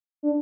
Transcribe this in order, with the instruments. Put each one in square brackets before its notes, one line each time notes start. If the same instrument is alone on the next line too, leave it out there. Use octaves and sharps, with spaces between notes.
[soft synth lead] D4